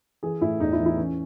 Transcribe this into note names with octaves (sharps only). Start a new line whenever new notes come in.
E3 G#4
A2 E4
E2 D#4
E4
E3
E4
E3 C#4